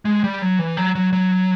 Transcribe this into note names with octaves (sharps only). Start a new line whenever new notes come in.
G#3
G3
F#3
E3
F#3
F#3
F#3